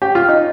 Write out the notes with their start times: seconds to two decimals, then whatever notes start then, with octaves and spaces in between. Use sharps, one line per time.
0.02 G4
0.15 F4
0.28 D#4